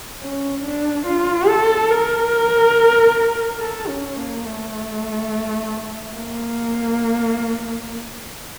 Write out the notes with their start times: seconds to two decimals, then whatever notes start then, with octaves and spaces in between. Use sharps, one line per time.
0.21 C#4
0.64 D4
1.06 F4
1.48 A4
1.91 A#4
3.60 A4
3.88 C#4
4.17 A#3
4.45 A3
6.14 A#3